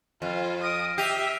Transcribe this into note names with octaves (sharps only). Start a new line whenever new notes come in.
F2 F4
D#6 F6 A#6 D7
G4 E5 C7 D#7 F7